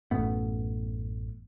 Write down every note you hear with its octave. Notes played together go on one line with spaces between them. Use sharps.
A1 F#2 A3 B3